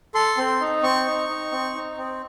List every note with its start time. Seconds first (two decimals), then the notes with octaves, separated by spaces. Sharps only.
0.15 A4 C6
0.38 C4
0.60 D#4
0.83 C4 C#6
1.06 D#4
1.29 D#4
1.52 C4
1.75 D#4
1.98 C4